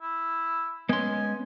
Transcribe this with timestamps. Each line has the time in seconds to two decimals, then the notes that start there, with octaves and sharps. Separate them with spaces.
0.02 E4
0.89 G#3 B3 C#4 G#5 C6